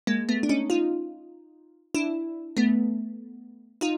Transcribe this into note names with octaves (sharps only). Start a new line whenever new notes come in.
G#3 A#3
A3 B3
D4
C#4 D#4
D#4 F4
D4 E4
A3 B3
D#4 F4